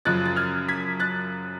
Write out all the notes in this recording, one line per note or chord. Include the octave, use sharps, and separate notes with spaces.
F#2 C#3 F3 F#6 A6
A6
F6 G#6
G#6 B6
F#6 A6